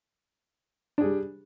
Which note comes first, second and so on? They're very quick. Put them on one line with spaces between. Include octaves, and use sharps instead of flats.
D4 G#4 G3